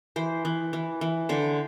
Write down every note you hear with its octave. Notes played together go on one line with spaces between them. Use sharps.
E3 C5
E3
E3
E3
D3 C5